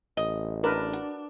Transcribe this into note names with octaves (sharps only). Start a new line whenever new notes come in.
A1 D#5
D4 A#4 B4
F#4